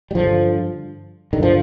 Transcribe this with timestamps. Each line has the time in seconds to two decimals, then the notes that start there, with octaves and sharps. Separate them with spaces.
0.11 G3
0.15 G2 D3 F3
1.33 G2 D3 D#3
1.43 F3